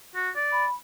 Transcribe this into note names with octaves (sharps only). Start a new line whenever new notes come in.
F#4
D5
B5